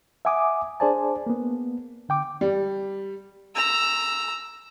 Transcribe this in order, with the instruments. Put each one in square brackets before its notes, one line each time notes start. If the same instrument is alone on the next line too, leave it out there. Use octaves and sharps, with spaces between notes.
[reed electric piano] E5 F#5 G#5 D6 D#6
D4 G#4 C5 D5 G#5 A5
A#3 B3
D3 G5 D6
[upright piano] G3
[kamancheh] A#5 E6